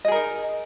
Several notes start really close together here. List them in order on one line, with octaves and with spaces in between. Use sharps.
D#5 G#4 A#4 D#4